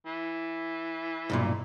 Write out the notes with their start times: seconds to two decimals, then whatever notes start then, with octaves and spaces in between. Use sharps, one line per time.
0.06 E3
1.30 B1 G2 A#2